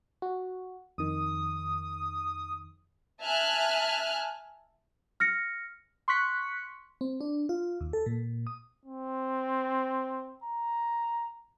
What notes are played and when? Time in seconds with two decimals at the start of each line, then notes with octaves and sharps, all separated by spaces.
0.22 F#4
0.98 F2 D#3 D#6
3.24 E5 G#5 A5 F6 F#6
5.20 F6 A#6 C#7
6.08 C6 C#6 F#6 B6 C#7
7.01 C4
7.21 D4
7.49 F4
7.81 D#2
7.93 A4
8.06 A#2
8.47 D#6
8.86 C4
10.44 A#5